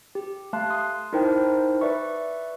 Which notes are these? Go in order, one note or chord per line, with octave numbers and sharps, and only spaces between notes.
G4
A3 F5 A5 C6 F#6
C6 D#6
D#4 E4 A#4 C5 G5 A5
B4 D5 E5 C#6